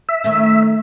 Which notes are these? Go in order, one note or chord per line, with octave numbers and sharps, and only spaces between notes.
E5
D#3 A3 C#4